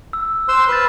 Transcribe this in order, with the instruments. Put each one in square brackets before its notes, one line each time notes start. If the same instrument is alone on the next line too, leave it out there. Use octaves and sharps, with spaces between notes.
[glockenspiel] E6
[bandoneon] C5 C6 E6 [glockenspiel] F#6
[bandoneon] B4 [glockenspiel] E6 F6 A6